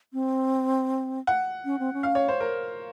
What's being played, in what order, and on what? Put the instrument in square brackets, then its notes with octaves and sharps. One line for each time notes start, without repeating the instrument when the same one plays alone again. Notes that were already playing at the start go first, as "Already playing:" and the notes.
[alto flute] C4
[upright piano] F#5
[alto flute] C#4
C4
C#4
[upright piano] F5
C#5
C5
A#4